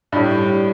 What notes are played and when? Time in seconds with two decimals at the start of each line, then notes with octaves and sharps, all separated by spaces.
0.12 G2
0.16 A2 G3